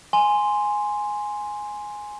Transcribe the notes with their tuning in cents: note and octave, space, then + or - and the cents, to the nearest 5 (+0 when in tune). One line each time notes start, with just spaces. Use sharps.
G#5 +0 C6 +0